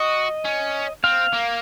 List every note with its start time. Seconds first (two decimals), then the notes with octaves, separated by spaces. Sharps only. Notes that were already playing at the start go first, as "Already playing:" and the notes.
Already playing: F#4 D#5
0.45 C#4
1.04 C4 F5
1.33 A#3